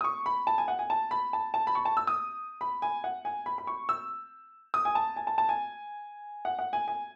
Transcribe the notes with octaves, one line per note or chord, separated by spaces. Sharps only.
D#6
C#6
B5
A5
G#5
F#5
G#5
A5
B5
A5
A5
B5
C#6
A5
E6
D#6
B5
G#5
F#5
G#5
B5
B5
C#6
E6
D#6
G#5
A5
G#5
A5
A5
G#5
F#5
F#5
G#5
G#5